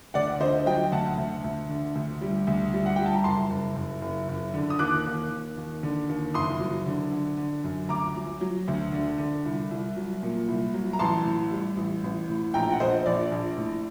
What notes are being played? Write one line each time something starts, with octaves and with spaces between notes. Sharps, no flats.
D2 D5 F#5
D3 C5 D#5
F#3 D#5 G5
D2 F#5 A5
D2
D2
D3
D2
G3
D2
G3
F#5
G3 G5
A5
A#5
F#1 A5 C6
F#1
F#1
F#1
F#1
D3
D#6
D#2 D6 F#6
D#2
D#2
D#2
D3
D#2
F#1 C6 D#6
F#3
D3
D3
D3
F#2
D2 A#5 D6
F#3
F#3
D2
D3
D3
C2
C2
F#3
A#2
C2
F#3
A#5
A1 A5 C6
A2
G3
A1
A1
A2
A#1 G5 A#5
F#5
A#1 C5 D#5
A#1 D5
A#1
A2